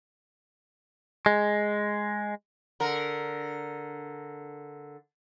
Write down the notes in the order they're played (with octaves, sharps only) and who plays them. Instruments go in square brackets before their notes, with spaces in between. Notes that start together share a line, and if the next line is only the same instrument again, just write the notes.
[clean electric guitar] G#3
[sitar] D3 A#4